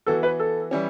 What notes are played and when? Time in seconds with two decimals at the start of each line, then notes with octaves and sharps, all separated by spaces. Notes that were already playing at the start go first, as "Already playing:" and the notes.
0.06 E3 B3 F#4 A4
0.23 B4
0.40 A4
0.71 E3 G3 C#4